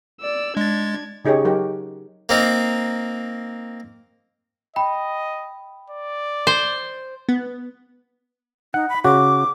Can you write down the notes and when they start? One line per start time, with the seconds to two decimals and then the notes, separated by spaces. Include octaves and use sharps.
0.21 D5 E6
0.57 G#3 D4 G#6 A6
1.25 C#3 D#4 G4 G#4 C#5
1.45 F#3 D#4 F#4 G4 A#4
2.29 A#3 C4 D#4
4.76 D#5 G5 B5
5.90 D5
6.47 C5
7.29 B3
8.74 D#4 F#5
8.89 B5
9.05 C#3 F#4 D6